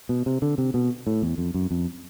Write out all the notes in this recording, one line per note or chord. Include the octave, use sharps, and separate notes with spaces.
B2
C3
D3
C3
B2
A2
E2
F2
F#2
F2